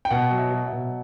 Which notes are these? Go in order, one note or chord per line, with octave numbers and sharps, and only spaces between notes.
G5
B2 F#5
F#3
E5
F#3
E5
B2